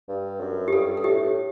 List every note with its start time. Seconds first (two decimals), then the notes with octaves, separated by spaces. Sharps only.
0.08 G2
0.40 F#2
0.68 G4
0.72 G2 A4
0.97 A4
1.04 A2 G4